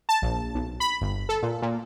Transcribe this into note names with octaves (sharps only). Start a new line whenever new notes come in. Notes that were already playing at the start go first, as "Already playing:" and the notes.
A5
A#1
B1
B5
G1
A4
A#2
A#2